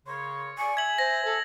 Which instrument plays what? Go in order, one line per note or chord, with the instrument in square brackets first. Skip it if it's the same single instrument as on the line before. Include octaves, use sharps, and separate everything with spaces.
[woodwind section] C#3 A#4 C#5 [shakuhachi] C6
[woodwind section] D5 C#6 [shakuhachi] G#5
[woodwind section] E5 [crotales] G#6 F#7
[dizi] C5 [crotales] A#6
[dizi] A4